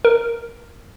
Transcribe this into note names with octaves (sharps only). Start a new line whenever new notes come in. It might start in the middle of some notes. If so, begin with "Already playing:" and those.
A#4